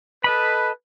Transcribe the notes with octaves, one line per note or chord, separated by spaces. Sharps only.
A4 B4 D#5 B5